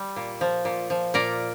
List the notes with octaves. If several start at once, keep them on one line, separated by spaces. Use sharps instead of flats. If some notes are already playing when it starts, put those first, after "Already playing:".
Already playing: G3
A#2
F3
A#2
F3
A#2 A#4 D5